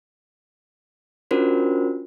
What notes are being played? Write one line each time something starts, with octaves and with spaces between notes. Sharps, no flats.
C#4 D4 F4 F#4 A#4 C5